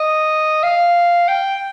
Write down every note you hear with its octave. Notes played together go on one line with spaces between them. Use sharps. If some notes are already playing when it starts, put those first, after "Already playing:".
Already playing: D#5
F5
G5